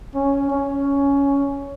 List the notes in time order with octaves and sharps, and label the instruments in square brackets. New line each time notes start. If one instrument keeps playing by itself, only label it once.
[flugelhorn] C#4
C#4